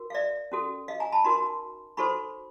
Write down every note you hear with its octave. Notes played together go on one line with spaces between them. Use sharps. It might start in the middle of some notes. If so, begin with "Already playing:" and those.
Already playing: F#4 A#4
F5
D5 E5
C#4 F#4 A4
D#5 F5
G#5 A#5
A5 B5
D#4 F#4 A#4 A#5 C6
D#4 F#4 A4 C5 B5 C#6